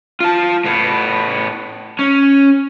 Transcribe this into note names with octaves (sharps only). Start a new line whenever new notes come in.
F4 A5
A2 B3
C#4